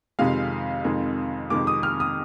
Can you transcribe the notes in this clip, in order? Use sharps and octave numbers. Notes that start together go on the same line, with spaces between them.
F2 C3 D#3 G#3 F5
F2 C3 D#3 G#3
F2 C3 D#3 G#3 D6
D#6
F6
D#6